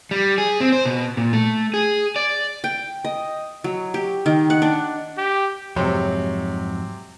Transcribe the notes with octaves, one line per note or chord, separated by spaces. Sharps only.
G3
G#4
C4
C5
B2
A#2
A3
G#4
D5
G5
D#5
F#3
G4
D#3
F#5
D4
G4
F2 G#2 C3 F#3